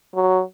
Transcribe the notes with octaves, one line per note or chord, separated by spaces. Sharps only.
F#3